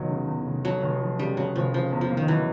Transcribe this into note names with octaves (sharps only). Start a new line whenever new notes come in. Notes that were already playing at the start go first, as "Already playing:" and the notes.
Already playing: F1 E2 D#3 F#3
C#3
E2
F1
F2 F#3
F1
F3
C#3 G3
F2 F#3
F1 F3
C#3 F3
E2
F3
A#3
D#3
E3 F#3